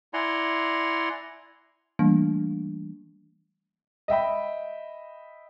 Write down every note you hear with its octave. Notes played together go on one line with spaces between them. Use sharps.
E4 D5 F#5 G#5 A#5 C6
E3 G3 A3 A#3 D4
D#5 E5 G5 B5